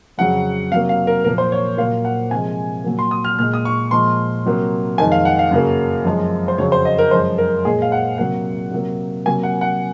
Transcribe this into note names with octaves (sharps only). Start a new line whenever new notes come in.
F2 C#3 F#3 F#5
C3 F#3 A#3 F5
F5
A#4
A#2 F3 A#3 A#4
C5
C#5
A#2 F#3 A#3 F5
F#5
C3 F3 G#3 G#5
A#2 F#3 A#3
C6
D#6
F6
A#2 G#3 F6
D#6
C#6
A#2 F3 G#3 C6
C3 F#3 A#3
F2 D#3 G#3 G#5
F5
F#5
F5
F#2 C#3 F#3 A#3
F#2 F3 G#3
C5
F2 C#3 F#3 C#5
C5
D#5
A#4
F#2 F3 G#3 C5
A#4
A#2 G#3 G#4
F5
F#5
C3 F#3 A#3 F#5
C3 F#3 A#3
C3 F#3 A#3 G#5
F#5
F#5